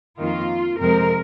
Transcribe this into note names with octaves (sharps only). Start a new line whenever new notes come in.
F2 D#3 A#3 F4
F2 C3 G#3 C4 A#4